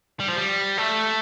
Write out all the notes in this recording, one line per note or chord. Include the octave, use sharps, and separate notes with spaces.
G3
F3
G3
A3